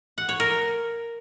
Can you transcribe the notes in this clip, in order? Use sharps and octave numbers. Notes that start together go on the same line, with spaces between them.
F#5
C#5
A#4